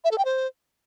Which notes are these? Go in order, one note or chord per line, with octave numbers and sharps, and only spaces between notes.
E5
A4
G5
C5